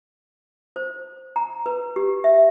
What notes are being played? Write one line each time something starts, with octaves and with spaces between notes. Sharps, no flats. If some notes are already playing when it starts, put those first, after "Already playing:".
C5
A#5
B4
G4
E5